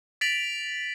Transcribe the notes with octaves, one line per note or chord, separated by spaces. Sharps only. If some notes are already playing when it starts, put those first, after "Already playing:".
A6 B6 D7 F7 F#7